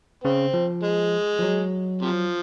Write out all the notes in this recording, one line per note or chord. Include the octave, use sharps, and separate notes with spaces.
C#3 C4
F3
G#3
F3
F#3
C3 F3